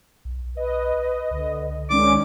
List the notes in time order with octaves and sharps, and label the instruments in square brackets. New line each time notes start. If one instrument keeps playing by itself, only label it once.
[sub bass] B1
[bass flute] B4 [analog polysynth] D#5
[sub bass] C#2 [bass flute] D3
[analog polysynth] D#3 G#3 C#4 [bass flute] D5 [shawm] D6